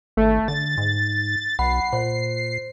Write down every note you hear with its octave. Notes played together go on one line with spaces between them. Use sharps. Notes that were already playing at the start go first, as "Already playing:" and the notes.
G#1 A3
D3 A6
G#2
B1 F#5 B5 C7
A#2 C5